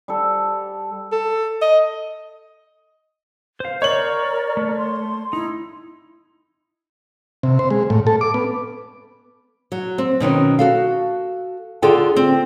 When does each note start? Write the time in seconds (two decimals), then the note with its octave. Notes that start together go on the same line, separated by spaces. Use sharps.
0.08 G3 A4
1.12 A4
1.62 D#5
3.60 C5 F5
3.82 A#4 C#5 D5 G6 F#7
4.57 A3
4.78 C6
5.33 D#4 E4
7.43 C3
7.59 C5
7.70 G#3
7.90 A2
8.07 A4
8.21 D6
8.34 B3
9.72 F#3
9.98 C4
10.20 B2 D#3 F#3 C#4
10.59 F#4 A4 F5
11.82 D3 F4 G#4 A4 G5
12.16 C4